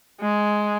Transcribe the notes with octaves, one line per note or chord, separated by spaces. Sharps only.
G#3